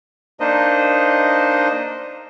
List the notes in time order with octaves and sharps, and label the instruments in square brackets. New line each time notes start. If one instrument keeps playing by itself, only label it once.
[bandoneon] A#3 D4 D#4 C5 D#5